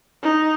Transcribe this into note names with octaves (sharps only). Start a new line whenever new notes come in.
D#4